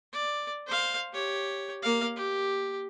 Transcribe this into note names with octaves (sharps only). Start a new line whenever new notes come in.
D5
C5 F5
G4 C#5
A#3 F5
G4